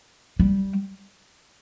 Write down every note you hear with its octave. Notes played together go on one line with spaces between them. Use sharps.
G3